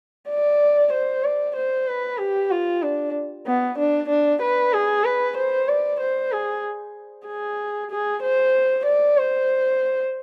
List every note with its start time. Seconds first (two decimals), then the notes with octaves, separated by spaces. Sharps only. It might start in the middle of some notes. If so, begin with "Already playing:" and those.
0.30 D5
0.93 C5
1.24 D5
1.56 C5
1.88 B4
2.19 G4
2.51 F4
2.83 D4
3.47 B3
3.79 D4
4.10 D4
4.42 B4
4.74 G#4
5.05 B4
5.37 C5
5.68 D5
6.00 C5
6.32 G#4
7.27 G#4
7.91 G#4
8.23 C5
8.86 D5
9.17 C5